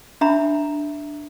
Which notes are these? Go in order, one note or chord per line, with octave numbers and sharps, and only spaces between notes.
D4 E5 A#5 B5